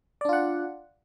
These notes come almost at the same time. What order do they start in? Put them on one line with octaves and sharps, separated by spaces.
D5 D4 F4 F#5